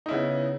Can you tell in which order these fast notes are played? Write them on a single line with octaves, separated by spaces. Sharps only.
D#4 E4 C#3 B3